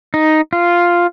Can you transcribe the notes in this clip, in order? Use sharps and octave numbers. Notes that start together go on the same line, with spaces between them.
D#4
F4